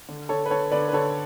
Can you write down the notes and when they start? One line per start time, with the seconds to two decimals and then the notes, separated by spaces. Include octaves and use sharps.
0.09 D3
0.29 D3 A4 C#5
0.45 B4
0.51 D3 A4 C#5
0.71 D3 B4 D5
0.89 B4
0.93 D3 A4 C#5